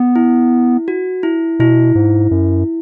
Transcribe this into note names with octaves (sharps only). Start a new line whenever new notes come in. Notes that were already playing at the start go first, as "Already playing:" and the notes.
Already playing: B3
E4
F#4
E4
B2 E4
G#2
F#2